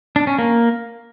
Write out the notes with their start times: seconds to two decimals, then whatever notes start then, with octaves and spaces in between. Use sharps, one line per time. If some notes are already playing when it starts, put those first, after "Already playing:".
0.16 D4
0.27 C#4
0.39 A#3